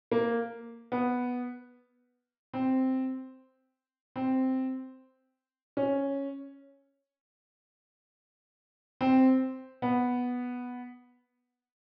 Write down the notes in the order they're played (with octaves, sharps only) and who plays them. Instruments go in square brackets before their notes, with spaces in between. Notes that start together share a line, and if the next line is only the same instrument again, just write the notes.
[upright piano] A#3
B3
C4
C4
C#4
C4
B3